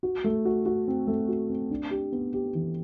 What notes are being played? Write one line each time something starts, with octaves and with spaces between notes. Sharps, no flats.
F#4
A3
F#4
F#4
C4
A3
F#4
C4
D4
G4
B3
G4
E3